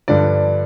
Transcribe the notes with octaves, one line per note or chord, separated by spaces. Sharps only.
G2 D3 F3 D5